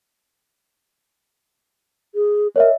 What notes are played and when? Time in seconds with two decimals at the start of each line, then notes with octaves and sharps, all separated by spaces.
2.15 G#4
2.56 A#4 C#5 D#5 E5